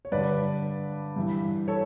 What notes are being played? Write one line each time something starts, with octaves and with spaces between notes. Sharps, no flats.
C#5
G2 D3 B4 D5
G2 E3
A4 C#5